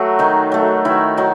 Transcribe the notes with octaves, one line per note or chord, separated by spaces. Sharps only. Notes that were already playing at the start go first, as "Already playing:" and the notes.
Already playing: F#3 A3 F#4
D#3 D#4
F#3 A3
D#3 E4
F#3 D#4